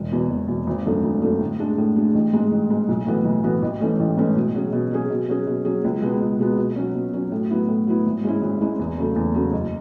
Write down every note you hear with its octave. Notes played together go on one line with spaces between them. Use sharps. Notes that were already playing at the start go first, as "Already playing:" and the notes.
Already playing: E1
E2 B2
E1
E2 B2
G#1
F#2 D3 A3
G#1
F#2 D3 A3
A2
G#3 D4
A2
G#3 D4
A1
G#2 G#3
A1
G#2 G#3
B1
A2 E3 B3 F#4
B1
A2 E3 B3 F#4
A1
G#2 E3 A3 C#4
A1
G#2 E3 A3 C#4
B2
F#3 C#4 G#4
B2
F#3 C#4 G#4
B2
F#3 C#4 G#4
B2
F#3 C#4 G#4
C#2
B2 G#3 B3
C#2
B2 G#3 B3
B2
F#3 C#4
B2
F#3 C#4
A2
F#3 B3 E4
A2
F#3 B3 E4
G#1
G#2 G#3 C#4 E4
G#1
G#2 G#3 C#4 E4
E2
C#3 F#3 A3
E2
C#3 F#3 A3
F#1